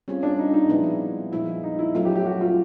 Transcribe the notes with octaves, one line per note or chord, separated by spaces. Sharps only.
G3 C4 C#4 F4 G#4
D4
D#4
D#4
A#2 F3 G#3 B3 E4
A#2 F3 G#3 E4
D#4
E4
F#3 A3 C#4 F4
G4
G4
F#4
F4